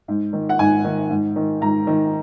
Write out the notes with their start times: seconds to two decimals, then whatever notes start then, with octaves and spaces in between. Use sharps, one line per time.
0.08 G#2
0.33 D#3
0.49 F#5
0.59 G#2 G#5
0.84 D#3
1.10 G#2
1.36 D#3
1.61 G#2 A#5
1.87 D#3